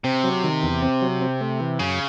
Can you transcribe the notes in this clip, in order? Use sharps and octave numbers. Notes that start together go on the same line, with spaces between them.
C3 C4
F#3
D#3
E2
C4
F#3
C4
A3
E3
F#2 C#3